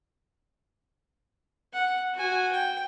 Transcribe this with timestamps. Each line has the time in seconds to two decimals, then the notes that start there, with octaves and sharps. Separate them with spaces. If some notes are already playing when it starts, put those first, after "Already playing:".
1.73 F#5
2.14 F#4 G#5
2.52 G5